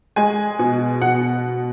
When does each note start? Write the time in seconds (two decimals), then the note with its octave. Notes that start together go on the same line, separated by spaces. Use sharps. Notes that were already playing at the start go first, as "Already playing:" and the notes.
0.16 G#3 G#5
0.59 B2
1.02 B2 F#5